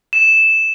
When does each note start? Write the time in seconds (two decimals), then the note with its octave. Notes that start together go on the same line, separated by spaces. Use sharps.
0.13 E7